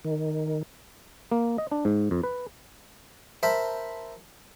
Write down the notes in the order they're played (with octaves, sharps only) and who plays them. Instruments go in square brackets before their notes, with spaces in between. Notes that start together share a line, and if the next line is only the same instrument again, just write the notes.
[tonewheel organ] D#3
[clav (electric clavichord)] A#3
D#5
D4
G#2
F2
B4
[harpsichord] A#4 C5 E5 A5 B5